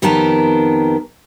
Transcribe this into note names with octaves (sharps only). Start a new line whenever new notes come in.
F2 D#3 B3 G4 A#4 A5